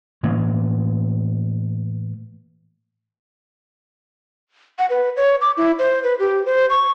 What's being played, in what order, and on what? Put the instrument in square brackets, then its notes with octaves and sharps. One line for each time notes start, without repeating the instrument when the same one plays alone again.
[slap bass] A2 E3 A#3
[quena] F#5
B4
C#5
D6
E4
C5
B4
G4
C5
C#6